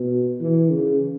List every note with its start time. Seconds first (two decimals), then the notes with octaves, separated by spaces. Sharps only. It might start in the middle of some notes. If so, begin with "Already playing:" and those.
Already playing: B2
0.41 E3
0.70 C#3